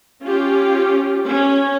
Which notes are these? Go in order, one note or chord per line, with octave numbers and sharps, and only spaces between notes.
C#4 F4 G4
C#4